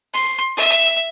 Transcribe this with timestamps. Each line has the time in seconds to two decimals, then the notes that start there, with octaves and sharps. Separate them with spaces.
0.14 C6
0.57 E5